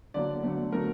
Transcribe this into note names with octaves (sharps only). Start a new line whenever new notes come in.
D3 F#3 A#3 D5
D3 F#3 A3
D3 F#3 A3 A#4